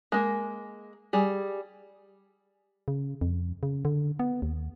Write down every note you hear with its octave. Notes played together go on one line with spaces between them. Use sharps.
G#3 A#3
G3 G#4
C#3
F2
C#3
D3
B3
D#2